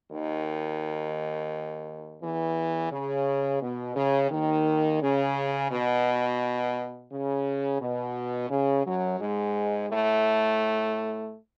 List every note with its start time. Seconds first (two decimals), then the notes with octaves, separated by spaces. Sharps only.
0.12 D#2 D#3
2.21 E2 E3
2.91 C#3
3.61 B2
3.96 C#3
4.31 D#2 D#3
5.02 C#3
5.71 B2
7.11 C#3
7.81 B2
8.50 C#3
8.86 F#2 F#3
9.20 G#2 G#3
9.90 A2 A3